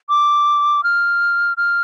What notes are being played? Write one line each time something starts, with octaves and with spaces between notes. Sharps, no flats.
D6
F6
F6